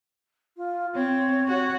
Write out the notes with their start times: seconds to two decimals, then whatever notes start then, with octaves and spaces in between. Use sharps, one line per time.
0.57 F4
0.94 C4 C#5
1.48 F#4